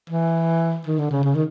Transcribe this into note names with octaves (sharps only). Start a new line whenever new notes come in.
E3
D#3
D3
C#3
C#3
D#3